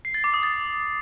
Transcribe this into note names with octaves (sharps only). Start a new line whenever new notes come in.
C7
A6
D6
D#6
A6